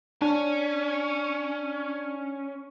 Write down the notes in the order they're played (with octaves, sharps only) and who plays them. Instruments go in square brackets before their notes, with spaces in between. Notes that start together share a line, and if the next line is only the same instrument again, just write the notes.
[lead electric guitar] C#4 [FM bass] D4